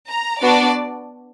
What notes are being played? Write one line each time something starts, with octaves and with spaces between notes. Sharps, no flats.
A#5
B3 D4 F#4 D5